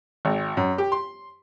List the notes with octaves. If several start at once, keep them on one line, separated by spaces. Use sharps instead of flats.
G#1
F#2
G4
C6